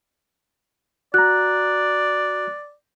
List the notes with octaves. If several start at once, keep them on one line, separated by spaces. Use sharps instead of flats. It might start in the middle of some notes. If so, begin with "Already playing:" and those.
F#4 D5 A#5 F#6